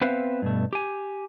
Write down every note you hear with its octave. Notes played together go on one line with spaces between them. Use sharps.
B3 C4 B4 C5 E5 F5
G2 B2 A3
G4 G#5